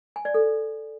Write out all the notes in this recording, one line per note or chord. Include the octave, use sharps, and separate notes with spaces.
G#5
D5
A4